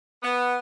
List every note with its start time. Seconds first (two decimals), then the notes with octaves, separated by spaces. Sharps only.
0.23 B3